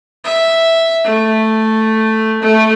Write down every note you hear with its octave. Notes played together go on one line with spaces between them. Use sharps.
E5
A3
A3